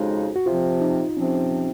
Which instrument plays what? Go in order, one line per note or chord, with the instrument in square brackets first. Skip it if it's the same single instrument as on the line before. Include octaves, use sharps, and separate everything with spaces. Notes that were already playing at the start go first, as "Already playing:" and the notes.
Already playing: [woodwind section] F2 C#3 G#3 D#4 [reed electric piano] F#4
[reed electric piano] F#4
[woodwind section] C3 F3 C4 [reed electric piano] F4
[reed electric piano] D#4
[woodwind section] C3 F3 C4 [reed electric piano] C#4